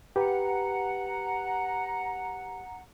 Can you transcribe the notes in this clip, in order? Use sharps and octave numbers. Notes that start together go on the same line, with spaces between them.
G4 B4 F#5 A#5